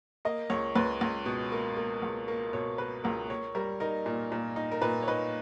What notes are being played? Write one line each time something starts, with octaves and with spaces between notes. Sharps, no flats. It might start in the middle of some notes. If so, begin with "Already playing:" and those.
A#3 D#5
C#2 C#5
C#2 B4
C#2
B2
A#3
A#3
C#2
A#3
B2 C#5
A#3 B4
C#2 A#4
A#3 C#5
G3 A#4
D#4 A#4
A#2
A#2
D#4
A#4
A#2 B4
C#5
D#4 B4